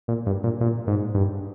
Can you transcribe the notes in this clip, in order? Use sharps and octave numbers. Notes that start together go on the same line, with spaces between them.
A#2
G2
A#2
A#2
G#2
G2